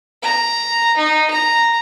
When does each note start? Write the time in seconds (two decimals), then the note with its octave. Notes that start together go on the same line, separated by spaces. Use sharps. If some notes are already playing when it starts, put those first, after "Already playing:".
0.23 A#5
0.97 D#4
1.31 A#5